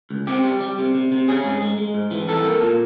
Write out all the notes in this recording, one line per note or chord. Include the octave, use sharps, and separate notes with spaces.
C#2
C3 G4
G3
G3
C3
C3
C3
C#4 G#4
G#2
G#3
G#3
G#2
E3
C2 A4
A#3
A#2